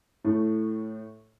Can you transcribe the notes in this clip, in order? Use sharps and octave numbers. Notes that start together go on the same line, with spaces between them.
A2 A3